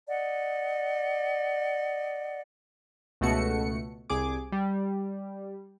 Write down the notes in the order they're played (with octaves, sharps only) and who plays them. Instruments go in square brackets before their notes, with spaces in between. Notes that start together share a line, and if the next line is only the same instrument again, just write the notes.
[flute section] D5 D#5 F#5
[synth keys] C#2 B2 A3 F#4 C#7
C2 G#4 D6
G3